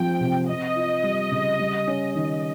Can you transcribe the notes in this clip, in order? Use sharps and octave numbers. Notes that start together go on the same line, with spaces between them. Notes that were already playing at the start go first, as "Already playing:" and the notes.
Already playing: F3 G#3 C4 G5
C3
C4 D#5
F4
G3
C#3
G3
C#4
D#3